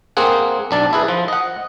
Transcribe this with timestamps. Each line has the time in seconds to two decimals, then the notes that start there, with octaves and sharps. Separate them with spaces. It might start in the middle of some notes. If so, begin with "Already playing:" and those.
0.17 A#3 C4 G#4 F#5
0.71 B1 D4 A5
0.93 E4 G#4 B4
1.08 F3
1.28 D#5 F#5